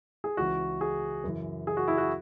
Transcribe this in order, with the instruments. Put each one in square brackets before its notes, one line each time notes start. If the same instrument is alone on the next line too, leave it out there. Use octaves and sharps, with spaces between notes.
[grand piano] G#4
C#2 C#3 E3 F#4
G#4
F#2 C#3 E3
G#4
F#4
E4
F#4